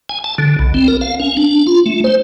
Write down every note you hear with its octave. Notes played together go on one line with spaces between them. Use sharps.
G#5
A5
D3
B1
C4
A#4
F5
C#4
D4
F4
A3
C5